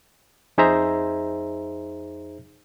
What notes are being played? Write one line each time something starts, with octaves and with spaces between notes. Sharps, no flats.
F2 D#4 G#4 C5 E5 A#5